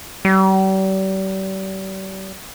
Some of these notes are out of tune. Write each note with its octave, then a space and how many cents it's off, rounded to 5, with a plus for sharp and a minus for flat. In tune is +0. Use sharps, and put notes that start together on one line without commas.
G3 -40